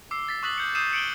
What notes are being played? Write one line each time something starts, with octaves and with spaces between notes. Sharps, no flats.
D6 E6 C7
A6 B6
C#6 D#6 F#6 A6 B6 F#7
G6 C#7
D#6 E6 G6 C7 D#7 E7
C#7 D7 F#7 G7